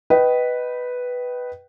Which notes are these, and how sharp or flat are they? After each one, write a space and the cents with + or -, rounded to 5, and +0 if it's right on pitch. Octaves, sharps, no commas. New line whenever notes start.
B4 +0 D#5 +0 G5 -25